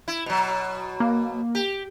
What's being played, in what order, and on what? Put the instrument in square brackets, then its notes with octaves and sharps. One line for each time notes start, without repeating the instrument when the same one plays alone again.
[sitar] E4
B2 F#3
[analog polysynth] A#3
[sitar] G4